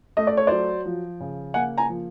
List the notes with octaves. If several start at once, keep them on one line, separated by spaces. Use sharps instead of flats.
A3 D#5
D5
C#5
F#3 C5 D5
F3
C#3
A#3 F#5 G#5
G#5 A#5
F3